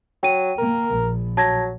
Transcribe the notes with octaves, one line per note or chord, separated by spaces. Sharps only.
F#3 G5 D#7
A#3 A#4
A#1
F#3 A5 G#6 A#6